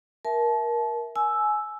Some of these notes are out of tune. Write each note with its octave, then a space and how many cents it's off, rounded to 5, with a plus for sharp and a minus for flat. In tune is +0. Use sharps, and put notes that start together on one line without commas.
A#4 +20 E5 +0 A5 -30
G#5 +25 E6 +0